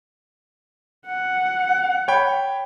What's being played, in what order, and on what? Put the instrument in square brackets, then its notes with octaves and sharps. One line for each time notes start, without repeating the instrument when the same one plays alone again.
[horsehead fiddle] F#5
[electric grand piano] C#5 G5 B5